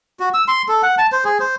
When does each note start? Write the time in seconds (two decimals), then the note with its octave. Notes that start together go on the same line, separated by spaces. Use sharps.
0.20 F#4
0.34 E6
0.48 C6
0.68 A4
0.82 F#5
0.98 A5
1.12 C5
1.25 G#4
1.40 C5